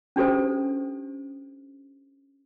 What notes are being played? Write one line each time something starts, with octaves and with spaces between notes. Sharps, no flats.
C#4 D4 G4 A4 C5